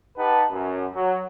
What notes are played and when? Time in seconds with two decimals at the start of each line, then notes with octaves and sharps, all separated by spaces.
0.18 D#4 G4 B4 F#5 A5
0.52 F#2
0.95 F#3